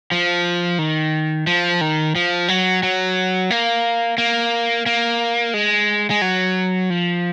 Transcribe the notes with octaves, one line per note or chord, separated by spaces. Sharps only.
F3
D#3
F3
D#3
F3
F#3
F#3
A#3
A#3
A#3
G#3
G#3
F#3
F3